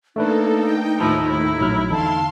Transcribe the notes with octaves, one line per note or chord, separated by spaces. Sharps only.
A3 A#3 D4 D#4 A4 B4
G5
D#2 A2 F3 E4
E4
A#1 F#3 F6
E2 D3 D#4 F5 A5 C6